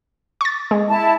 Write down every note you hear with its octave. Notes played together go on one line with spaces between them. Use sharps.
C#6 A6
G#3
E4 A5